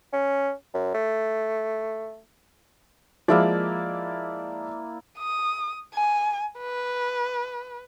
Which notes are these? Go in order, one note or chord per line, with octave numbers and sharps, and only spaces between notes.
C#4
F#2
A3
F3 G#3 A#3 E4 D5
D#6
G#5
B4